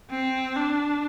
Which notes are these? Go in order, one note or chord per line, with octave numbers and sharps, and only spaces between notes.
C4
D4